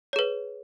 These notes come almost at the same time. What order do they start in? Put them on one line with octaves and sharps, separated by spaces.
C#5 G#4 B4